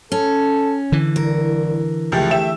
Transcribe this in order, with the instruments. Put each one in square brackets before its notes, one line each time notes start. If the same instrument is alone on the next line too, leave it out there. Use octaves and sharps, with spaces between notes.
[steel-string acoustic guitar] C#4 [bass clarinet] A4
[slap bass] D3 E3
[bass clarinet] C2 [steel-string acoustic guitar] A#4
[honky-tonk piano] C#2 F3 G4 [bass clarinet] A3
[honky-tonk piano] G4 E5 E7